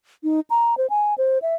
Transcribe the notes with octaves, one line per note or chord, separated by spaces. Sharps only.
D#4
A#5
C5
G#5
C5
E5